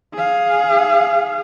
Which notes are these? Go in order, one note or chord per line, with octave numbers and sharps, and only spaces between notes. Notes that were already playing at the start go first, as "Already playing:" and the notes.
G#4 F5